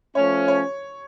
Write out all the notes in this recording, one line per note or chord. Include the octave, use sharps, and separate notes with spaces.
F3 A3 C#4 C#5
C#5